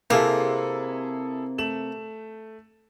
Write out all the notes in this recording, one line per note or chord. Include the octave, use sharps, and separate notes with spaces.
C3 A#3 E4 G#4 A4
A3 E7 F#7